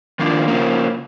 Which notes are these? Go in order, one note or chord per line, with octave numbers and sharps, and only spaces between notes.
D#3 F3 A#3 D4 F4
C#3 F3 A#3